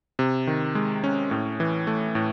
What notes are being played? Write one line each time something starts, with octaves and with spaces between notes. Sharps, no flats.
C3
D#3
G#3
C#4
A2
E3
A3
A2